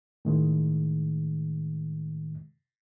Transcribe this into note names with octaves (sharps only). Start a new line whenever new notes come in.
A2 D#3 G#3